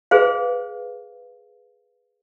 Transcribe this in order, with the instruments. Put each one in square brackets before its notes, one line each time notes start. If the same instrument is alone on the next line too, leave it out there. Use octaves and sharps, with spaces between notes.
[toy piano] G#4 B4 C5 F5